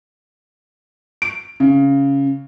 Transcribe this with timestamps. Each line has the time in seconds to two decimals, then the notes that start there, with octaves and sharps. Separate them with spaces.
1.22 D7
1.60 C#3